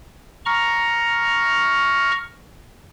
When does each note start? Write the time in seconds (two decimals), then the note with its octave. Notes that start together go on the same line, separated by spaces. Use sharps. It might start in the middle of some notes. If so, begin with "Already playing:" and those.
0.46 A#5 C#6 F6